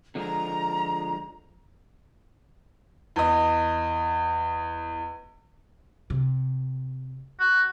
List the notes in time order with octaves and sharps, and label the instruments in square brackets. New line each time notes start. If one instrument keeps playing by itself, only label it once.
[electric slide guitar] D3 F3 G#3 [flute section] A#5
[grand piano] E2 D#5
[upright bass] C3
[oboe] F#4